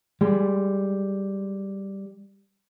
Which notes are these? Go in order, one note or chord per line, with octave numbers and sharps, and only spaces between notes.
G3 G#3